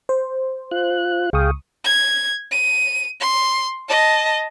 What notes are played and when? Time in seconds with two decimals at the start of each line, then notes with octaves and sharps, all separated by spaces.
0.09 C5
0.71 F4 F#6
1.33 C#2 G#4 F5 G5 C#6 D#6
1.85 G#6
2.51 D#7
3.21 C6
3.89 D#5 A5